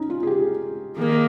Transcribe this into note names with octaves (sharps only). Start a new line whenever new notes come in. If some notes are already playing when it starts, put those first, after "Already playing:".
Already playing: C#4 D#4
F4
G#4
G4
D#3 A#3 G#4